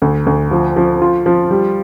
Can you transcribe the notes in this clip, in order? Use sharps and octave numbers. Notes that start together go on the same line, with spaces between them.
D2
D2
F3
F3
F4
F3
G3